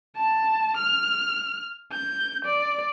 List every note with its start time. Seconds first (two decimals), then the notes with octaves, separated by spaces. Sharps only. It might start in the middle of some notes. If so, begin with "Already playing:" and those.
0.16 A5
0.77 F6
1.92 G6
2.45 D5